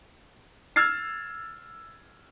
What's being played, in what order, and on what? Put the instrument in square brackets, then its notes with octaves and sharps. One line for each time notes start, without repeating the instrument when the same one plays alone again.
[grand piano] E6 F6 G#6 A6 C7